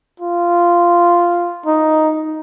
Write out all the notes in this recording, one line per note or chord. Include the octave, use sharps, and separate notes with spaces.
F4
D#4